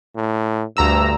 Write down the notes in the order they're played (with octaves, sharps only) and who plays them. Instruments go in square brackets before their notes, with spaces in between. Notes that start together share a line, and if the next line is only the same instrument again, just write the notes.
[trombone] A2
[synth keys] D2 A#5 E6 [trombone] G2